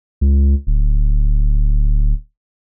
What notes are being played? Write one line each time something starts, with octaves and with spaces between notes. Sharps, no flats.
C#2
D1